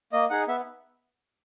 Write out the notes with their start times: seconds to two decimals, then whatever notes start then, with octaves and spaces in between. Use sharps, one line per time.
0.13 A#3 D#5
0.30 D#4 G#4 F#5
0.47 B3 E5